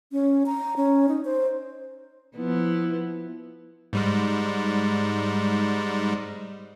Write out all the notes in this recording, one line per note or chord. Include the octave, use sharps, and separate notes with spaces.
C#4
A#5
C#4
D#4
C5
F3 B3 E4
G#2 G3 G#3